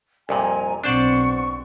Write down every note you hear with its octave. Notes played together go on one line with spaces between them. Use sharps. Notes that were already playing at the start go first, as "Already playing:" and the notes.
C2 F2 A#2 G#5 A#5
B1 C4 D4 C5 D5 F#5 C#6